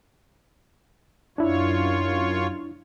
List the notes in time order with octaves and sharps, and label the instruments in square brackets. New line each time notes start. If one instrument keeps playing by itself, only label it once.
[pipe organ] F#2 F4 C#5 [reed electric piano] D4 E4